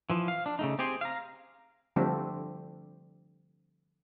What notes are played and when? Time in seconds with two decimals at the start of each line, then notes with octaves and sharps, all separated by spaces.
0.10 E3 F3
0.28 F5
0.46 D4
0.59 C#3 A3 D#4
0.79 C4 G4 G#4 C5
1.01 F5 A#5
1.96 D3 F3 G3 A3 C4 D4